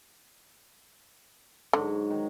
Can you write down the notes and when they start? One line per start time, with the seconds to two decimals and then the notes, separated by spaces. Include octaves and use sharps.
1.73 G#2 D3 F#3
2.10 D#3